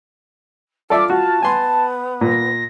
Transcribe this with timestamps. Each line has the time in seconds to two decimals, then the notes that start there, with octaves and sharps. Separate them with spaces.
0.90 F4 A4 D5 E5 D6
1.10 F#4 A5
1.42 B3 G#5 C6
2.21 A#2 A#6